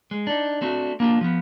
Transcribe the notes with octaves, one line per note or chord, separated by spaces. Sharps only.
G#3
D4 D#4
A3 C4 D4 F#4
A#3 D4 F4 G4
F3 B3